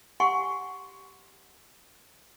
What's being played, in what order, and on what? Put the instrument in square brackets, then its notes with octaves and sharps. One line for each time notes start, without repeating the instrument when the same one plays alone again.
[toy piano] G4 F#5 G#5 C6 C#6